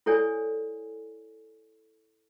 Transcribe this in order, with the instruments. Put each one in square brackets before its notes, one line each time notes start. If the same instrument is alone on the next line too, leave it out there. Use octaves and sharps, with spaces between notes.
[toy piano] E4 A4 C#5 D5 G#5